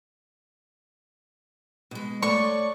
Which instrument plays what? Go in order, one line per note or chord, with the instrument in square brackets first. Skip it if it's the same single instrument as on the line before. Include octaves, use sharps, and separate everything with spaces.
[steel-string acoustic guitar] B2 G#3
[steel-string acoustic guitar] A3 C#5 F#5 [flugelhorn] D5 [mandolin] C#6